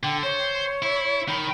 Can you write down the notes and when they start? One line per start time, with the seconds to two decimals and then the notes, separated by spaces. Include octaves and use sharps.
0.03 D3 G5
0.23 C5 C#5
0.82 E4
1.28 D#3 B5